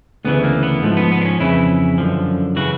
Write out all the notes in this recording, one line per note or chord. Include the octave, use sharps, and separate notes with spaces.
D2 C#3 E3 B3
A#3
B3
G#2 F3 A3
B3
B3
D4
C#4
F2 C#3 E3 E4
F#2 D3 F3
C#3 E3 F#4